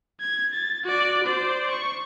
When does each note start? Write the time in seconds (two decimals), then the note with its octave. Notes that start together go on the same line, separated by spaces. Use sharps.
0.21 G#6
0.53 A6
0.84 F#4 D5
1.23 C5 D5
1.71 C#6